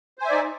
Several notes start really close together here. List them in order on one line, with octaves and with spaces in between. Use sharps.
C5 G#5 E5 D5 D#4